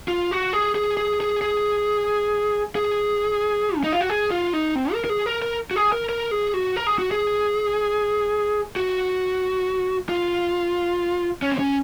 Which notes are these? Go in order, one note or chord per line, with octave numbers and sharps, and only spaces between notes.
F4
F#4
G#4
G#4
G#4
G#4
G#4
G#4
C#4
D#4
F4
F#4
G#4
F4
D#4
C4
A#4
A#4
G#4
A#4
A#4
F#4
G#4
A#4
A#4
G#4
F#4
A#4
G#4
F#4
G#4
F#4
F4
C#4
C4
C#4